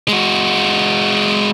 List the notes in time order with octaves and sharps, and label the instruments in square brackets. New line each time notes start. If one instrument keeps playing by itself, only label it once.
[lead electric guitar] G#3 F#4